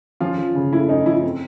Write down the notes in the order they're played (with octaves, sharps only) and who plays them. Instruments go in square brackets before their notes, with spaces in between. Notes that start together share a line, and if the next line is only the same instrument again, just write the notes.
[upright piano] F3 C#4 F4
F3
C#3
A3 E4
C#4 D#4
F3 E4
C4